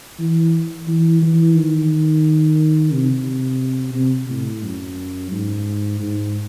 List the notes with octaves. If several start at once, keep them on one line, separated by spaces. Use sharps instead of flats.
E3
E3
E3
D#3
C3
C3
A2
F#2
G#2
G#2